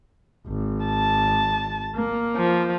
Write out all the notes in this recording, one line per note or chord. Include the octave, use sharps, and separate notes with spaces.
G#1
A5
A#3
F3